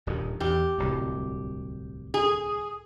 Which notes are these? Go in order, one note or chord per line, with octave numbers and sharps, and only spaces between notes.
D#1 G2 D#3
E2 G4
D1 C2 G2
G#4